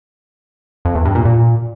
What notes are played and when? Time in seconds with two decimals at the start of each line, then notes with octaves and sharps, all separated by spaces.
0.85 F2
0.95 E2
1.05 G2
1.15 A#2
1.25 A#2